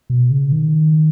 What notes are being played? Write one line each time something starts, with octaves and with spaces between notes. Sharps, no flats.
B2
C#3
D#3